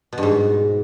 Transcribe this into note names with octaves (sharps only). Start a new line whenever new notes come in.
B2
G2
G#2